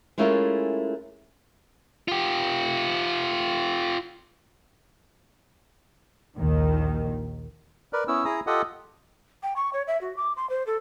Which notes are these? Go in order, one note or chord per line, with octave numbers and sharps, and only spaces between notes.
G#3 A3 C#4 E4 F4 A#4
F4 G4
A#1 D#2 D#3
A#4 B4 D5
B3 C#4 E4 E6
E4 G#4 A#5 D#6
F4 G4 A4 D#5 F#5 D#6
G5
C#6
C#5
E5
F#4
D6
C6
C5
A4